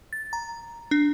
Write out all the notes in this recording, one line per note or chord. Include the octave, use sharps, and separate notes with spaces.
A6
A#5
D4